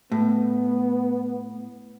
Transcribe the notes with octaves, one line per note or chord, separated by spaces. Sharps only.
A2 B3